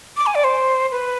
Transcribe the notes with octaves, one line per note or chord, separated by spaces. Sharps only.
D6
G#5
D5
C5
B4